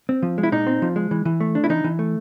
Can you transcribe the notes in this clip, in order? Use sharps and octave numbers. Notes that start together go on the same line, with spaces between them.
C4
F3
G#3
E4
A#2 D#4
C4
F3
G#3
E3
E3
A3
D4
E4
E3 D#4
E3
A3